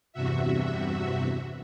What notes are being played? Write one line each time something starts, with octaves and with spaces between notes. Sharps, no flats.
E2 G2 C3 F#4 E5